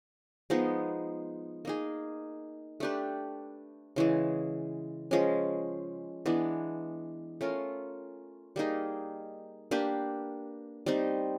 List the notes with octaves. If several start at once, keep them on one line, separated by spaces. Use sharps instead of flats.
F3 G#3 B3 D#4
A#3 D#4 G#4
A3 D4 G4 B4
C#3 E3 G#3
F3 G#3 C#4
E3 G#3 B3 D4
A3 C#4 F4 A#4
G3 A#3 D#4 G#4
A#3 D4 G4 B4
G3 C4 D#4